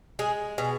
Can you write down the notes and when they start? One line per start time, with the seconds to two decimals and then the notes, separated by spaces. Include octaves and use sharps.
0.19 G#3 G#4
0.58 B2 G#4